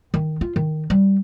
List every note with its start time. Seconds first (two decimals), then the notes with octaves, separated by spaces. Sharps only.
0.14 D#3
0.41 F4
0.56 D#3
0.90 G3